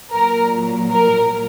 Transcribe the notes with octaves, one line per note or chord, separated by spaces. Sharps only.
A#2 F#3 A#4
A#4